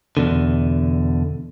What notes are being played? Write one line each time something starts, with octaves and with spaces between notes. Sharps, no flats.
E2 B2 D3